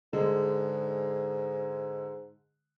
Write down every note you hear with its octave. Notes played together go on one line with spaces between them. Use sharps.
G#2 D3 G#3